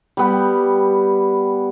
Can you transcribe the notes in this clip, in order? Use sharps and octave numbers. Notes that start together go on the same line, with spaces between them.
G3 B3 G4